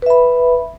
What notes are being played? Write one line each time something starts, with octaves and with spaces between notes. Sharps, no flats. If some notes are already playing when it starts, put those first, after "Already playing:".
B4 E5 B5